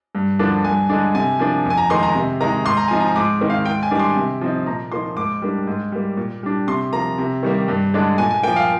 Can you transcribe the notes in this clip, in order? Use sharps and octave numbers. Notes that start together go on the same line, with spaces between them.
G2
D3 F3 A#3 D4
G2 G#5
D3 G#3 D4
C3 G#5
F3 A#3 D4
F2
G#5
A#5
D#3 G#3 C6
A#5
C3
D#3 G#3 D#4 A#5
G#2 C6
A#5
F3 C4 D#4 G#5
A#5
G#2 D6
D#3 G#3 C4 D#4
F5
G#2 G5
G#5
D#3 G3 D4 D6
C6
C3
F3 C4 D#4
A#2 A#5
F3 A#3 D#4 C6
G#2 D6
G3 A#3 D4
G#2
G3 A#3
A#2
G3 D4
C3 C6
F3 A#3 A#5
C3
D#3 G3 A#3
G2
D3 G#3 D4
A#2 G#5
G#5
F3 A#3 G5
F5